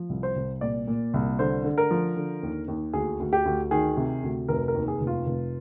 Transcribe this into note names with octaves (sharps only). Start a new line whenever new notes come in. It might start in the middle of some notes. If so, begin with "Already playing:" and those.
Already playing: F3
C2
C5
C2
A#2 D5
A#2
C2
D3 C5
D3
A#4
F3
D3
D#2
D#2
D2 G#4
D2
G4
D2
D#3 G#4
C3
D2
F1 A#4
A#4
D#2
G#4
F1
F4
F1